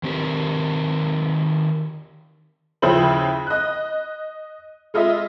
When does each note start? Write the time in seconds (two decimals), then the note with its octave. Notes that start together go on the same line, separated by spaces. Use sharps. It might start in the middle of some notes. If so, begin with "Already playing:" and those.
0.03 D#3 C4 G4 A#4
2.82 D#2 C#3 F3 E4 C5 F#7
3.47 D#5 F#6
4.94 G#3 F4 D#5 E5